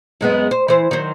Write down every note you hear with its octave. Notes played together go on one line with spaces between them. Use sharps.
F#2 G#3 B3
C5
E3 C5
D#3 F#3 C5